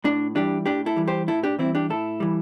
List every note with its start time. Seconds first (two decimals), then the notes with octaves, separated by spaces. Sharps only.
0.04 A2 D4
0.35 E3 G3 D4 G4
0.66 A2 D4 G4
0.86 E4 A4
0.96 E3 G3
1.08 G4 C5
1.28 A2 E4 A4
1.44 D4 G4
1.59 E3 G3 C4 E4
1.75 D4 G4
1.90 A2 E4 A4
2.20 E3 G3